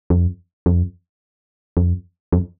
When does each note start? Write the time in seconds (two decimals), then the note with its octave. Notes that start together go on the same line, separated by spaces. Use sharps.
0.10 F2
0.66 F2
1.77 F2
2.33 F2